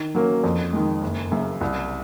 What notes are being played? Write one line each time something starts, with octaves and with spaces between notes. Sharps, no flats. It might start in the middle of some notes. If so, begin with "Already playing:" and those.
Already playing: D#3
F#3 A#3 C#4
F2
D#3 G#3
F#1
F#2 C#3
C2